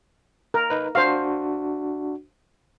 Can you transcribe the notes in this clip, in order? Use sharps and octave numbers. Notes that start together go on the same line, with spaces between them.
A#4
D#4 B4
D4 F#4 C5 F5